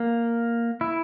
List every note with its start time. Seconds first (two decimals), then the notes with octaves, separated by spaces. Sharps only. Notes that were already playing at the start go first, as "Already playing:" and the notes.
Already playing: A#3
0.81 E4